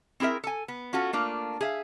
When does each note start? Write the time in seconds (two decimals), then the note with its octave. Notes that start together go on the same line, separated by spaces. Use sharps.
0.20 C4 E4 G#4 A#4 E5
0.44 A4 G#5
0.68 B3
0.93 C#4 F4 F#4 A4
1.13 A3 A#3 D4 F4
1.61 G#4 E5 F5